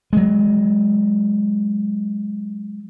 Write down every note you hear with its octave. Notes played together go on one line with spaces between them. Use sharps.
F#3 G#3